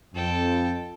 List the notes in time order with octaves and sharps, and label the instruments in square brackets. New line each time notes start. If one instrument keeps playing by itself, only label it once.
[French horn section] F2 [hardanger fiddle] A4 G5